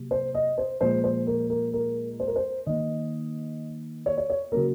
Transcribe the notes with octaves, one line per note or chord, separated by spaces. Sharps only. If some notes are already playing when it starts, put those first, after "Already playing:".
Already playing: C3 F#3 A#3
C5
D#5
C5
A#2 F3 G#3 C5
C5
A#4
A#4
A#4
C5
A#4
C5
D#3 A#3 D#5
C#5
C#5
C#5
C#3 F#3 A#3 A#4